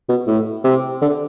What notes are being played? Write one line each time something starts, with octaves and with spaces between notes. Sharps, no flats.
B2
A2
C3
D3